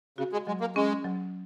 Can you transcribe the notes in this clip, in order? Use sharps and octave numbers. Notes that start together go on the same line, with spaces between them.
C#3 F#4
G#3
F#3 G#3
A#3
G#3 C#4
F#3